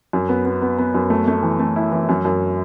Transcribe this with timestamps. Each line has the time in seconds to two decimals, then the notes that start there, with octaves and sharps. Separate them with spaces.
0.13 F#2
0.29 B3
0.45 B3
0.62 B3
0.79 B3
0.94 F#2
1.10 A3
1.28 A3
1.43 E3
1.59 A3
1.76 E4
1.92 E3
2.09 F#2
2.25 F#2